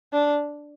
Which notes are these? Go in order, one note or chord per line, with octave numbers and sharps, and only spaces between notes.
D4